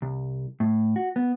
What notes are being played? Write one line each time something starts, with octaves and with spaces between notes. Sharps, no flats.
C2
A2
F#4
B3